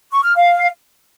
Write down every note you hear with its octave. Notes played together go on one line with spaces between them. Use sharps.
C#6
F6
F5